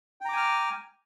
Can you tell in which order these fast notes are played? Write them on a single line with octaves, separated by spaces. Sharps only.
G5 A#5 D6 G#5 F6